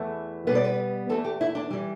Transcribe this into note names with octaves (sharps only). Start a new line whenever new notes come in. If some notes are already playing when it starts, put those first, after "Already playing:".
Already playing: E2 E3 A3
B2 G3 B3 B4
D5
B4
E2 E3 A3 A4
G4
E4
D4
E3 G3